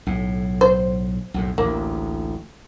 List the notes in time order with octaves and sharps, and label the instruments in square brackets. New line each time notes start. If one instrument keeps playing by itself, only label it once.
[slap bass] B1 A2
[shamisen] C5
[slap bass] B1 F2 A2
[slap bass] A1 D2 [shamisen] A#3